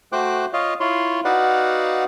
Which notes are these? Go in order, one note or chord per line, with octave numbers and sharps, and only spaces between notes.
A3 F#4 C5 G5 D6 F#6
F4 C#5 D#5 F5
E4 F4 C#5 C6
D#4 F#4 B4 D5 F5 F#5